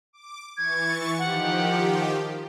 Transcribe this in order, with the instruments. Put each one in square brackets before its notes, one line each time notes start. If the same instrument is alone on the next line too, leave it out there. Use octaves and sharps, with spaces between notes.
[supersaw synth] D6
[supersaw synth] E3 C#6 A6 [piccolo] G#6
[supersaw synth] D#3 F3 G4 [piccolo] F#5